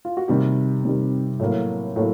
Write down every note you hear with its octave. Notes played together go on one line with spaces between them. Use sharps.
F4
F#4
C3 D#3 G3 G4
C3 D#3 G3
A2 F#3 A#3
A2 F#3 A#3